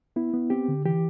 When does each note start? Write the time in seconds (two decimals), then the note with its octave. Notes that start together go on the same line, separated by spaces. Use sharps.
0.16 B3 E4
0.34 B3
0.50 C4 G4
0.68 D3
0.85 E3 G4